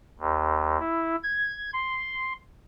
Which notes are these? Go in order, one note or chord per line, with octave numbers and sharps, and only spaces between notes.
D#2
E4
G#6
C6